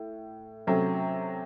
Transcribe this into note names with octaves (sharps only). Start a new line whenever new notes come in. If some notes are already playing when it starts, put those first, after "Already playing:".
Already playing: A2
C3 F#3 A3 C#4